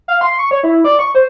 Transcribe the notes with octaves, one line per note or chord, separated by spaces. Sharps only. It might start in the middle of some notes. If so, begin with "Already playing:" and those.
F5
C6
C#6
C#5
E4
D5
C#6
C5